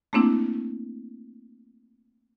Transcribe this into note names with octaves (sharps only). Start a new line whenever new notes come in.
A3 A#3 C4 D4 E4